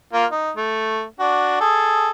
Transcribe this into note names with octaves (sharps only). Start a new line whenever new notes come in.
A#3 F4
D#4
A3
D4 F#4
G#4 A4